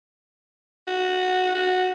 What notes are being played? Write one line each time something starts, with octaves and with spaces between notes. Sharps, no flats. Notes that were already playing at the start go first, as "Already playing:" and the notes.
F#4
F#4